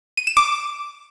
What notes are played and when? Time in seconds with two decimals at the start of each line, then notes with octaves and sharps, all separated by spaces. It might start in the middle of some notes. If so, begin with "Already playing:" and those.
0.17 D#7
0.27 E7
0.37 D6